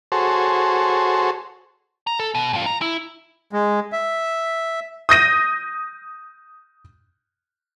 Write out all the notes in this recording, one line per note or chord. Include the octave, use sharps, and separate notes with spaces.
F#4 G#4 A4 C5 C#5
A#5
A4
B2
G2 F4
A#5
E4
G#3
E5
D#6 G6 A#6 D#7